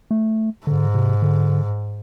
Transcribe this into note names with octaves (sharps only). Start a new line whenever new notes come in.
A3
G#2 D3
C3
D3